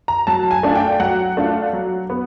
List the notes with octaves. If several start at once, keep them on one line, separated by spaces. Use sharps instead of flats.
A#5
F#3 A5
G#5
A3 D4 F4
G5
F#3 F#5
A3 D4 F4
F#3
B3